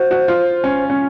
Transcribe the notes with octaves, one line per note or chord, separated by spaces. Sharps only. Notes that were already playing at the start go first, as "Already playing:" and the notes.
Already playing: F#4 C5
F#4
F4
C#4
C#4